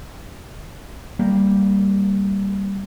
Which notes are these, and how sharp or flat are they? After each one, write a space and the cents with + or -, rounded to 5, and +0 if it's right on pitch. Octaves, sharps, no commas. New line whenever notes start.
G3 +0 A#3 -10